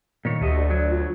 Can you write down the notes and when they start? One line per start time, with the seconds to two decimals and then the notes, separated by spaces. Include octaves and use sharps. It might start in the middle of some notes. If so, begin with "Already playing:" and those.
0.25 A#2 D#3 C#5
0.41 D2 A3 G4 D#5
0.58 D5
0.70 F#3 D5
0.89 F4